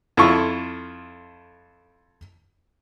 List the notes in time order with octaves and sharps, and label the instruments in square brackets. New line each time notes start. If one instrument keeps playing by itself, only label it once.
[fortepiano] F2 E4 F4 A4 C#6